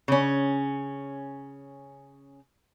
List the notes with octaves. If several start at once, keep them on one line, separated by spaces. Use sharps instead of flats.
C#3 C#4